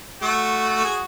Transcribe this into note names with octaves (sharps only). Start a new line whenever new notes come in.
A3 F#4
G#4